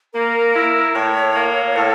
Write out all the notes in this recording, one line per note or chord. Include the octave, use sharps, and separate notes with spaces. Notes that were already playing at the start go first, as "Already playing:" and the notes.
A#3 A#4
E4
A2 C#5
A#3
A2 A4